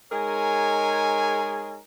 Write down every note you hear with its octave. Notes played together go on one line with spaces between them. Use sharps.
G#3 D#4 G#4 A#4 C#5 G#5